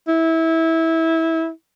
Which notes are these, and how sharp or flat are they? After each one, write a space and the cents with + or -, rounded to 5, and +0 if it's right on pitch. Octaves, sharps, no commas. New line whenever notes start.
E4 -20